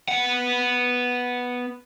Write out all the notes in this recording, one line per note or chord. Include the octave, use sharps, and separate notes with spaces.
B3 F#5